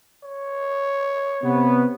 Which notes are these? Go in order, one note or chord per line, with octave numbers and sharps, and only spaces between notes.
C#5
C3 B3